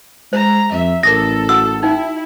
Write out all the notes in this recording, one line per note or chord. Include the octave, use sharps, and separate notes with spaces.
G#3 C5 A#5
F2 E5
A1 A4 A#4 D6 D#6 A#6
F#4 F#5 D#6 E6
D#4 E4 G5